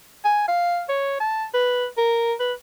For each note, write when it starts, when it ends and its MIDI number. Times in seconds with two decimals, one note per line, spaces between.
0.25 0.47 80
0.48 0.84 77
0.89 1.16 73
1.20 1.45 81
1.54 1.87 71
1.98 2.33 70
2.40 2.53 71